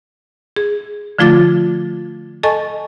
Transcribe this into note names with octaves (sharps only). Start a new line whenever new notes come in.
G#4
D3 F3 A3 F4 D6 A6
A4 D#5 G#5 A5 C#6